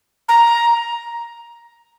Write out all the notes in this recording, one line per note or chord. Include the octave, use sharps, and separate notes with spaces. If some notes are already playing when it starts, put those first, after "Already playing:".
A#5